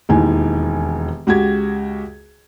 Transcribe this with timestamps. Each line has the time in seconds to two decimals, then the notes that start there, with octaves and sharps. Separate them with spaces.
0.09 E1 D#2 D#3 E3 G#5
1.27 C#2 F#4 G4 G#6